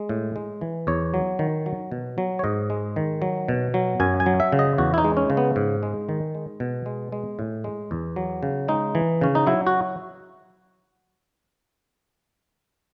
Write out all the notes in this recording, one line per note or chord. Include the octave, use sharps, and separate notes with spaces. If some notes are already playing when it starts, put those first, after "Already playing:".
Already playing: G#3
A2
G#3
E3
E2 C#5
F#3
D#3
F#3
B2
F#3
C#5
G#2 D#5
G#3
D#3
F#3
B2
F#3
F#2 G#5
G#5
F#3
E5
C#3
D#5
E2 F#4
E4
D#4
G#3
C#4
C#3
B3
G#2
G#3
D#3
G#3
B2
G#3
G#3
A2
G#3
E2
F#3
C#3
G#3 D#4
E3
C#3 C#4
D#4
F#3 E4
F#4